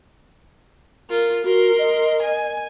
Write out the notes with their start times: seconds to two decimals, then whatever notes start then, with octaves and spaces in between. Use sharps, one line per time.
1.10 F4 A#4
1.45 F#4 A#4 C6
1.78 D#5
2.22 G#5